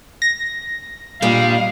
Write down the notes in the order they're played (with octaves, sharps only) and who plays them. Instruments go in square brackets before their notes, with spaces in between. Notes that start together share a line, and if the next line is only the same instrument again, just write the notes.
[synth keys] A#6
[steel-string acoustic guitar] A#2 G#3 D4 [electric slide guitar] G3 [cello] F5